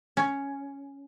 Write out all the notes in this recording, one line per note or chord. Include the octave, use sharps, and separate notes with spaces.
C#4